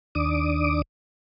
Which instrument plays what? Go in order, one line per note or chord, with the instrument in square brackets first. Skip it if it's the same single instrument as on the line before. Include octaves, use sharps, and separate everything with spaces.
[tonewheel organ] D#2 D4 D6 D#6